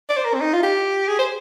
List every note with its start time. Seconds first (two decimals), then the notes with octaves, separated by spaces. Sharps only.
0.09 D5
0.17 C5
0.25 A#4
0.34 C4
0.41 D#4
0.53 F4
0.63 G4
1.08 G#4
1.19 C5